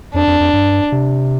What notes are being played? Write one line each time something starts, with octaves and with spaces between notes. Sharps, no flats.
F2 D4
F2
F2
G2
C3